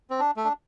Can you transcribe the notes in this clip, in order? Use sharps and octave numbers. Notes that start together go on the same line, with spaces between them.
C4
D4
A3
D4